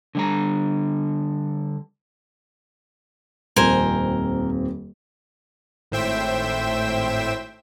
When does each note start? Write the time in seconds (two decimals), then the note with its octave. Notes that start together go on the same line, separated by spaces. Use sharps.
0.15 D3 G3 A#5
3.56 D#1 F2 C4 A#4 C5 G#5
5.92 G#1 A2 C5 E5 G5 E7